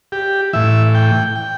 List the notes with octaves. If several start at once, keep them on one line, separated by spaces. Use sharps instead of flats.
G4
A2 E3 E5
G5
G5